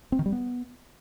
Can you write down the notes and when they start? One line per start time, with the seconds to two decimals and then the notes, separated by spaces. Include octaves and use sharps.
0.12 C4
0.19 D#3
0.26 G3
0.32 B3